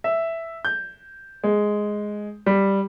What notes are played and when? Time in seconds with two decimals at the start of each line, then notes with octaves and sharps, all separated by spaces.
0.04 E5
0.65 G6
1.44 G#3
2.46 G3